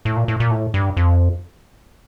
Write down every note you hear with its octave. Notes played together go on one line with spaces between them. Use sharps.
A2
A#2
A2
A#2
A2
G2
F2